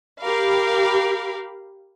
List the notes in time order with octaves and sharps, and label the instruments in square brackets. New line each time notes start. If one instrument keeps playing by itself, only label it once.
[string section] G4 A#4 F5 B5